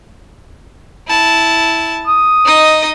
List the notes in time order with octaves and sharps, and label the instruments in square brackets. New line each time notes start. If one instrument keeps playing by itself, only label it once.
[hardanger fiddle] E4 A5
[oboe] D#6
[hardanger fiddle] D#4 D#5